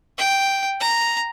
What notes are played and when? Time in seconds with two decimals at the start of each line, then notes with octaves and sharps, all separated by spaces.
0.18 G5
0.80 A#5